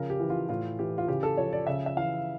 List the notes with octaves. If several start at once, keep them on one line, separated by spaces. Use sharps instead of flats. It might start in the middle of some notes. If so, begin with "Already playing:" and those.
Already playing: C#3 F3 A#4
G4
E3
F4
A2 F4
E3 G4
F4
C#3 G4
A4
F3 C#5
D5
C#3 E5
E5
E3 F5